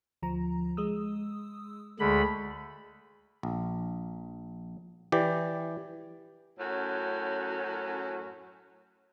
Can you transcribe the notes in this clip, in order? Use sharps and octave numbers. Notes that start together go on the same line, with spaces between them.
D2 F3 A#5
G#3 D#6 E6
D2 D3 G#3 B5
A#1
E3 G4 D5
F#2 A2 F#3 C#4 F#4